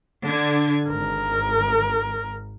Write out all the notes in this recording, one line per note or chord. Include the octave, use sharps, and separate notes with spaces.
D3 G#6
G#1 A#4